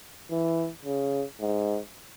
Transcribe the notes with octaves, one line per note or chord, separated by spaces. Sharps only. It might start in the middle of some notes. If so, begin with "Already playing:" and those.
E3
C#3
G#2